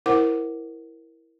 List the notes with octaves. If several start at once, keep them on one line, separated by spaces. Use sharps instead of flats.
E4 A#4 C5 F#5 D6